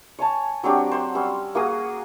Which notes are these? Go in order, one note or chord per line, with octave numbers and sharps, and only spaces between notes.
C#5 G#5 A5
F#3 C4 D4 G4
C5 F#5
G3 C#4 E6
A#3 F#4 G#4 D#6